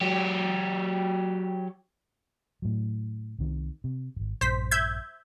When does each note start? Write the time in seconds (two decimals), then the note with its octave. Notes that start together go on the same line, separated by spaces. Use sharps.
0.01 F#3 G4
2.62 A2 F#3
3.39 C2 C3 D#3
3.84 C3
4.16 D#1 G#1
4.41 A#1 G2 C5 B6
4.71 E5 G6 G#6